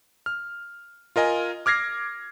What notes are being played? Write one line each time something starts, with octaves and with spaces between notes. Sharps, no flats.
F6
F4 A#4 D#5 G#5
D6 F6 G#6 A#6 C7